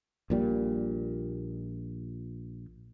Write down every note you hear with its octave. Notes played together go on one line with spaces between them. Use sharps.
A#1 A#2 G3